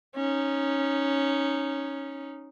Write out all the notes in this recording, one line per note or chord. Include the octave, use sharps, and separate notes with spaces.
C#4 D#4